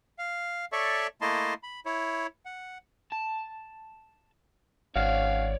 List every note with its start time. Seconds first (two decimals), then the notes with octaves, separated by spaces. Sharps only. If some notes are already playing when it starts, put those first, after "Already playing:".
0.19 F5
0.72 A4 C#5 D5 E5 C#6
1.21 A3 A#3 E4 D#5 A5 C6
1.63 B5
1.86 E4 C#5
2.45 F#5
3.12 A5
4.96 G#1 C#4 F#4 C#5 D5 F5